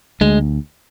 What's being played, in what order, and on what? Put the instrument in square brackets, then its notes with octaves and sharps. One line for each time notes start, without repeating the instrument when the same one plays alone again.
[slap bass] D2 [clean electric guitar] G#3